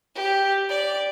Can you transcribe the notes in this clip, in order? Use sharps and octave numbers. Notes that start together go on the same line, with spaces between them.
G4
D5